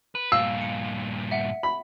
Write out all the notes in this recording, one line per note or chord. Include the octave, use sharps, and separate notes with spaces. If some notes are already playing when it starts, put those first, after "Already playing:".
B4
G2 A#2 F5 E6
C#7
E5 F#5
B5